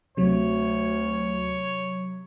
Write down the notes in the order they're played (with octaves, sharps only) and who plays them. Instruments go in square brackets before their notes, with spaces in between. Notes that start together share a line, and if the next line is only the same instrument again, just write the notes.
[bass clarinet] D2 [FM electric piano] C3 F#3 [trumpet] C#5